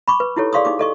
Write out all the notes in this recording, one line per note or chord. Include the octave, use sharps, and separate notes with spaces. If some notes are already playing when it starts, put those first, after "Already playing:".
B5 C#6 D6
B4
D#4 E4 G4 A4 C#5
G#4 D5 F5 C6 C#6 D#6
D#4 G4 D6
A4 D#5 C#6